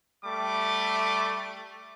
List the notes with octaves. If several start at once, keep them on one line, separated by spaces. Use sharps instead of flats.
G3 A3 D6